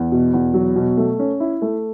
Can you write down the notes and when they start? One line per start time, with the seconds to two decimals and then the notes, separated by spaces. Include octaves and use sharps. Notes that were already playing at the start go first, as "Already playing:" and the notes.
Already playing: E2
0.12 B2
0.34 E2
0.54 F#3
0.76 B2
0.97 A3
1.19 C#4
1.40 E4
1.62 A3